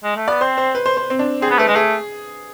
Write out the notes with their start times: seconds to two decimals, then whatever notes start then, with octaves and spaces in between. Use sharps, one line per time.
0.04 G#3
0.16 A3
0.28 B3 D5
0.41 C4 C5
0.58 C5
0.75 B4
0.86 C5
0.97 C5
1.10 C4
1.19 D4
1.42 C4 G#4
1.50 B3
1.58 A3 B4
1.67 G#3
1.75 A3 G#4